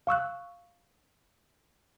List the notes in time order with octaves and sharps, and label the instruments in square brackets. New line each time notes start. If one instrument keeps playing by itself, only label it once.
[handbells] F5 C#6 E6 F#6